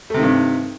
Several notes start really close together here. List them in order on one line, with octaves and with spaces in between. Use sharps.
A3 C3 D#3 G2